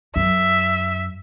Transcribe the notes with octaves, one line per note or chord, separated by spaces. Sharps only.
F#2 E5